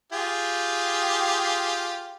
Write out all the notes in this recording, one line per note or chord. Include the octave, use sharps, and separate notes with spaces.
F4 G4 G#4